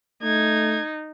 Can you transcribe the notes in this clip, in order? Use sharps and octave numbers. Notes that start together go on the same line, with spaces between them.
A3 D#4 G#6